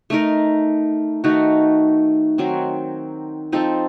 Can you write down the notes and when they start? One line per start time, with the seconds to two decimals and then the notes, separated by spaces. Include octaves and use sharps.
0.10 A3 D#4 A#4
1.24 D#3 A3 D#4 F#4
2.38 D#3 F#3 C4
3.52 F3 C4 D#4 A4